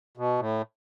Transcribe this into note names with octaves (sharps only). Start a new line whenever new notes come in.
B2
A2